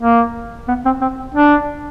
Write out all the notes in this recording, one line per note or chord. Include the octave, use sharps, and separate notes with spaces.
A#3
B3
C4
C4
D4